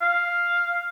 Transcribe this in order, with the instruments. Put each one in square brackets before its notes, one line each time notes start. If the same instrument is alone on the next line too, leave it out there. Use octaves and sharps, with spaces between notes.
[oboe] F5